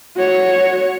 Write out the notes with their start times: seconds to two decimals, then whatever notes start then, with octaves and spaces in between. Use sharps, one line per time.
0.17 F#4 C#5